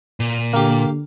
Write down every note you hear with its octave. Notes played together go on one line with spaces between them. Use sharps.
A#2
D3 A#3 G4